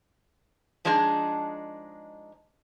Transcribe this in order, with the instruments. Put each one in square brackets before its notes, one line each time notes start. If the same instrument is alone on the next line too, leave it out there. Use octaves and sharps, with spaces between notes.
[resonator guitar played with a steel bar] F3 G#3 D4 D#4 G#4